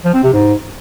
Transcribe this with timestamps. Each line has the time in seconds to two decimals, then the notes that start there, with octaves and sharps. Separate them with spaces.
0.05 F3
0.14 C4
0.24 C3
0.33 G#2